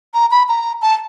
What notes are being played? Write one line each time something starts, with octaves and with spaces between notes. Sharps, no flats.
A#5
B5
A#5
A5